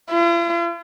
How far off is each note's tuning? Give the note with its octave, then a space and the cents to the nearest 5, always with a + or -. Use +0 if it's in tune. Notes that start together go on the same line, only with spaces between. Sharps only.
F4 -45